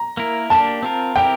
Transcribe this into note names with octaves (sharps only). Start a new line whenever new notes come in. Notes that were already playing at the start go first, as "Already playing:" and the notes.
Already playing: A#5
A#3 E4 A#4
A#3 D4 G4 A5
C4 F4 A#4
C4 E4 G4 A#4 G5